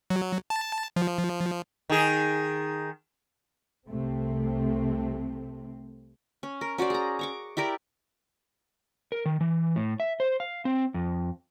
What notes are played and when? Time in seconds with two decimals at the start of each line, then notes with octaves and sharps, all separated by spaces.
0.10 F#3
0.50 A5
0.96 F3
1.90 D#3 G#4
3.88 C2 C3 A3 C4
6.43 C#4
6.61 A#4
6.78 C#4 F#4 C5 D5
6.90 G#4 A#5
7.19 A#5 C#6 D6
7.57 E4 G4 A#4 D5
9.12 A#4
9.26 D#3
9.41 E3
9.76 A2
10.00 E5
10.20 C5
10.40 F5
10.65 C4
10.94 F2